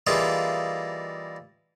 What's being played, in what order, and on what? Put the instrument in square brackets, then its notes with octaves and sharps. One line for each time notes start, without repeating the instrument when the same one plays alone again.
[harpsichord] E3 G3 A#3 D#4 F4 G#4